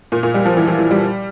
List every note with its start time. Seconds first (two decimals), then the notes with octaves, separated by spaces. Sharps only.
0.12 A#2
0.23 A#2
0.34 G3
0.45 F3
0.57 E3
0.68 E3
0.79 E3
0.91 G3